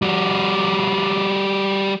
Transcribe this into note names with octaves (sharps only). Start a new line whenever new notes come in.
G3 F#4